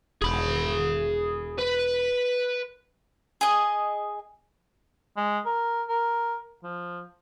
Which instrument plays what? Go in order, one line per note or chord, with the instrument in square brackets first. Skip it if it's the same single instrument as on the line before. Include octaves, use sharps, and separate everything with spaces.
[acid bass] E1 [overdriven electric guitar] G#4 B5
[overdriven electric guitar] B4
[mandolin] G#4 D#5
[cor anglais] G#3
A#4
A#4
F3